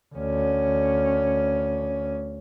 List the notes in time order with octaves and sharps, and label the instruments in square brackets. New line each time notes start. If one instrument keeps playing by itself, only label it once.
[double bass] D2 C#4